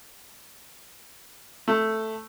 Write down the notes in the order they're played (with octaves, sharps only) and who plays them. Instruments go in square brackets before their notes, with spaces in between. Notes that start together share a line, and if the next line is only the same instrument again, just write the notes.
[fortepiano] A3